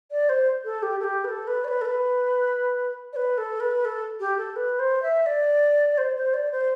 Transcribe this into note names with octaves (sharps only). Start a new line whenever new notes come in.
D5
C5
A4
G4
A4
G4
B4
A4
B4
D5
B4
A4
B4
D5
B4
A4
B4
A4
G4
A4
B4
C5
E5
D5
C5
C5
D5
C5